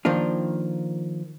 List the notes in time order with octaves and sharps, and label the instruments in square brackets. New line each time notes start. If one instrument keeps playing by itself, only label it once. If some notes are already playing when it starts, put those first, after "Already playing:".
[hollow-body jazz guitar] D#3 F3 A#3 D4 F4